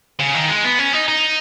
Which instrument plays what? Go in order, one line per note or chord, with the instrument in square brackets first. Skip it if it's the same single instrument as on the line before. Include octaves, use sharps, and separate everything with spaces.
[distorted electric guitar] C#3
D#3
G#3
B3
C#4
D#4
D#4